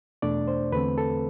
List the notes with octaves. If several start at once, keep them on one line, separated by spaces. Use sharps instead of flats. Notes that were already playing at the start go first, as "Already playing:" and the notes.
E2 B2 A3 D4 D5
C5
E2 D3 A3 C4 B4
A4